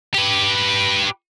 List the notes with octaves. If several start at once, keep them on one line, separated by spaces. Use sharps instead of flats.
G4 B4